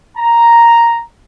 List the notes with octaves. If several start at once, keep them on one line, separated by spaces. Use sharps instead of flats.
A#5